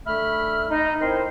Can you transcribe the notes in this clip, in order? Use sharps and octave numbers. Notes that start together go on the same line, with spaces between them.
D3 A3 E5 B5 F6
D#4
C4 E4 A#4 C5